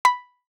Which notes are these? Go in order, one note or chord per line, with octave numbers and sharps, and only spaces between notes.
B5